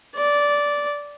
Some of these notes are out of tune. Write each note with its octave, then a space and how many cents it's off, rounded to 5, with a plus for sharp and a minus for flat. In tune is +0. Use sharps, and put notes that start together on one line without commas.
D5 -10